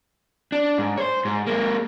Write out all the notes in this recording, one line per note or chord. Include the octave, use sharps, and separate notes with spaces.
D4
G#2
C5 C#5
G#2
G#3 A#3